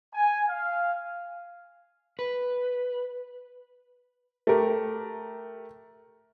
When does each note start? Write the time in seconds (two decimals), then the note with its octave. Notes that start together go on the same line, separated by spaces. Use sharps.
0.13 G#5
0.47 F5
2.19 B4
4.47 A3 G4 A#4